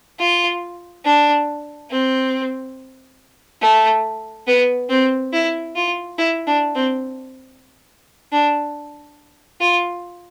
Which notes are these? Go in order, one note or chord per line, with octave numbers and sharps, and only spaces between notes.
F4
D4
C4
A3
B3
C4
E4
F4
E4
D4
C4
D4
F4